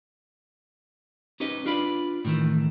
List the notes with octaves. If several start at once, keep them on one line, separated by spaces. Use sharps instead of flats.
C#4 D#4 G4 B4 D#5
D4 F4 B4 D5 B5
A2 D#3 E3